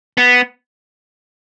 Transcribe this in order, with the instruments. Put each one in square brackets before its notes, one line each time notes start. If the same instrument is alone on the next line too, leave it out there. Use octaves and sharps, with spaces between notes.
[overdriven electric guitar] B3